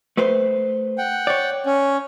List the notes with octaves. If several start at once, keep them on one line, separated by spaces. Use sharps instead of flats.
A3 B4 C5
F#5 G5
C#5 D5
C#4